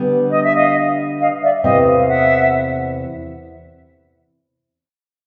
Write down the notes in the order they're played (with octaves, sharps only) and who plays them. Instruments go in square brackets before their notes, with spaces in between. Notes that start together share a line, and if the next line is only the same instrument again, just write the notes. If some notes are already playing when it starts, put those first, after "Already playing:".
Already playing: [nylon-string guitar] D3 G3 B3 D4
[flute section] D#5
E5
D#5 F5
D#5 F5
D5 E5
[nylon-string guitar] E2 C3 E3 A3 C4 [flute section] D#5 F5
[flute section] F5
E5 F#5